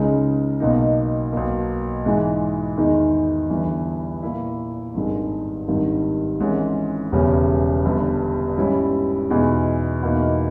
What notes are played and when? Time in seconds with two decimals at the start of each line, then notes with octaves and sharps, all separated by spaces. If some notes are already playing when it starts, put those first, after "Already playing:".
Already playing: C#2 C#3 G#3 D#4
0.60 B1 B2 A#3 D#4
1.33 B1 B2 A#3
2.05 G#2 E3 G#3 D#4
2.77 E2 D#3 G#3 D#4
3.50 G1 G2 E3
4.23 A#2 A#3 E4
4.95 G#1 G2 D#3 G#3
5.68 G#1 G2 D#3 G3
6.40 G#1 G#2 E3 G#3 C#4
7.12 E1 E2 C#3 G3 C#4
7.85 G1 G2 G3
8.58 G#2 G3 C#4 E4
9.30 E2 B2 G#3 D#4
10.02 E2 B2 A#3 D#4